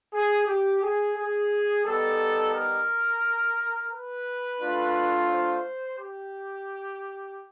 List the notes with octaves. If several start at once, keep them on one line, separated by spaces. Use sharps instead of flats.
G#4
G4
G#4
G#4
G3 B3 D#4 A4
A#4
B4
A3 D4 F4
C5
G4